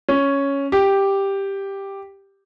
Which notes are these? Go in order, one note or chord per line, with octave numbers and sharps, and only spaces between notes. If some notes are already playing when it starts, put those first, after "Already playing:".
C#4
G4